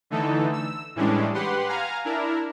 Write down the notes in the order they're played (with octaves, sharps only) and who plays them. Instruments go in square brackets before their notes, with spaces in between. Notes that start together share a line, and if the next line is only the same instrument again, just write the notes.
[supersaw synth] D3 E3 A3 D#4 A4
E6
A2 E3 G3 G#3 C#4 D4
G4 B4 F#5 C6
F5 G#5 A#5 F6
D4 E4 A#4